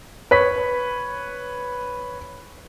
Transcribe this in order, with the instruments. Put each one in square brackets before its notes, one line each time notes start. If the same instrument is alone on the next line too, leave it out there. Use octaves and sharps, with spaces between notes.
[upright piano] B4 C#5 B6